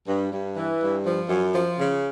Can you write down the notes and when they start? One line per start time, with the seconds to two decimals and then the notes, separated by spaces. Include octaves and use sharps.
0.08 G2
0.32 G2
0.56 E3
0.81 G2
1.05 F3
1.29 F#2
1.55 F3
1.79 C#3